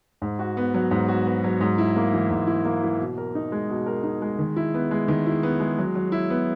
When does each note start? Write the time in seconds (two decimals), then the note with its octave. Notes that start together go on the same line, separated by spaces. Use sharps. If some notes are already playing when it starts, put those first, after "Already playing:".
0.22 G#2
0.39 F#4
0.57 B3
0.74 F#3
0.91 G#2
1.08 F#4
1.26 B3
1.44 F#3
1.61 G#2
1.78 E4
1.96 A#3
2.14 E3
2.30 G#2
2.47 E4
2.65 A#3
2.83 E3
2.99 B2
3.17 A#4
3.35 D#4
3.52 G#3
3.69 B2
3.86 A#4
4.04 D#4
4.22 G#3
4.39 D#3
4.56 E4
4.74 B3
4.91 G#3
5.08 D#3
5.26 E4
5.43 B3
5.60 G#3
5.78 F#3
5.95 F#3
6.12 E4
6.30 B3